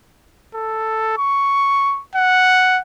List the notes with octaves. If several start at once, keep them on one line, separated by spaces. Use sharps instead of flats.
A4
C#6
F#5